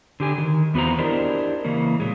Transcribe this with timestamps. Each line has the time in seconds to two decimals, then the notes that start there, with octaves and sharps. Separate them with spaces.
0.20 D3 G4 G#5
0.38 D#3
0.74 E2 B3 F#4 C5 A#5
0.99 D4 E4 G4 A#4 C5 D#5
1.64 C#3 E3 A#3 C#4
2.00 A#2 F#3 G#3